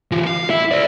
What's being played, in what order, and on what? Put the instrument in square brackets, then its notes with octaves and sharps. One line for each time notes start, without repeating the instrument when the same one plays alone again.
[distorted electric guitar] E3 F4
F5
E4
D5 E5